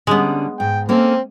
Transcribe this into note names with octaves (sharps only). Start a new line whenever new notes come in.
D3 G3 G#3 B3 C#4
G#2 G5
A#3 C4 C#4 A4